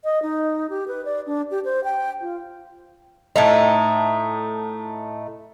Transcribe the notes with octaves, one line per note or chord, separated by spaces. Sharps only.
D#5
D#4
G4
B4
D5
D4
G4
C5
G5
F4
A2 A3 D#4